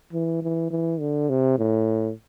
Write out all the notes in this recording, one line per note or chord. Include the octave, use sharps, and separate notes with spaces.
E3
E3
E3
D3
C3
A2